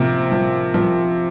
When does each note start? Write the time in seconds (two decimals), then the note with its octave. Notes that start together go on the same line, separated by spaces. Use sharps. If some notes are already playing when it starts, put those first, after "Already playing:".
Already playing: C3 F3 A#3
0.32 F3
0.74 F3